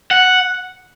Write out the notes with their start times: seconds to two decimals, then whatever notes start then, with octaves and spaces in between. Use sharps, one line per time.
0.11 F#5